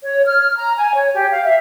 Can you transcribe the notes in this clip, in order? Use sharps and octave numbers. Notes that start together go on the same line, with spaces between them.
C#5
F6
A#5
G#5
C#5
G4
F5
E5